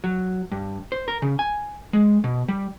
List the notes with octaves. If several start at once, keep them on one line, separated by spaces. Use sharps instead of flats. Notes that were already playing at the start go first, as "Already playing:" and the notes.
F#3
G2
C5
A#4
C#3
G#5
G#3
B2
G3